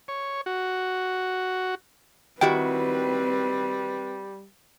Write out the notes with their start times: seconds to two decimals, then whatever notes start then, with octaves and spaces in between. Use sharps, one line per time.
0.08 C#5
0.46 F#4
2.41 D#3 G3 C4 E4 F#4 G4 B4 G5